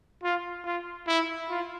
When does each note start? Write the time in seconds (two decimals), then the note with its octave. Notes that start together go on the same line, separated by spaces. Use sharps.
0.23 F4
0.65 F4
1.07 E4
1.49 F4